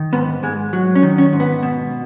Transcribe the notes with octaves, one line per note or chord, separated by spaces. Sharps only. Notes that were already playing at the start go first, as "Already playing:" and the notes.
Already playing: D#3
G#2 B3
G#2 G#3
F#3
C#4
D#3
C#4
G#2
B3
B2